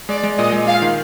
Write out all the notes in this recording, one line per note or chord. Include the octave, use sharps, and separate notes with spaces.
G#3 D5
G#3
A#2 D#5
G#3
F4 F5
D#3